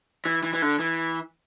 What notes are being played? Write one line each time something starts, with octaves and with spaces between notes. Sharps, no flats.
E3
E3
E3
D3
E3